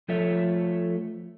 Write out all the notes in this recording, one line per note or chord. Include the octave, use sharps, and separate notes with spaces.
F3 A3 F4 A4 C#5 E5